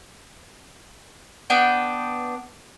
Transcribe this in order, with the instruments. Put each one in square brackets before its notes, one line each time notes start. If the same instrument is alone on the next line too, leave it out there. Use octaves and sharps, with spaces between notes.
[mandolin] B3 D4 G5